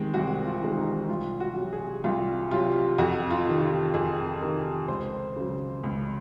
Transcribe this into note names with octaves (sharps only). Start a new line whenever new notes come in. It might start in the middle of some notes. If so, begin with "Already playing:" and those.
Already playing: C3 D#3 G#3 C4
C2 F#4
F4
C3 D#3 G#3 C4
D#4
C2 F4
F#4
C3 F#3
G#4
C2 F4
C3 F#3 F4
F2 F#4
F4
C3 D#3
F4
F2 G#4
C3 D#3 A#4
C#2 C5
C#3 F#3
C#2